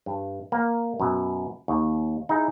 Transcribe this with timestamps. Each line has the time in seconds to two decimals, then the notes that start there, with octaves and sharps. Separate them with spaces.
0.06 G2
0.52 A#3
1.00 F#2 B2
1.68 D#2
2.29 D#4 E4 G#4